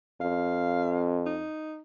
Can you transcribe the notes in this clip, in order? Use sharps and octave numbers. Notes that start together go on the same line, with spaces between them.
F2 F5
D#4